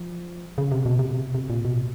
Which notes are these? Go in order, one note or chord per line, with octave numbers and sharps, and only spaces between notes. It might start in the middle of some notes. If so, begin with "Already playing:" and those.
Already playing: F3
C#3
C3
B2
C3
C3
A#2
B2